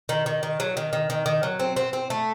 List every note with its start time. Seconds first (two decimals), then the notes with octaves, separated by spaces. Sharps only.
0.09 D#3
0.26 D#3
0.43 D#3
0.60 F#3
0.77 D#3
0.93 D#3
1.10 D#3
1.26 D#3
1.43 F#3
1.60 C4
1.76 C4
1.93 C4
2.10 A3